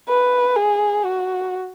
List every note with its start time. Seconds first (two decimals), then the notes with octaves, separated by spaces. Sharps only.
0.08 B4
0.56 G#4
1.05 F#4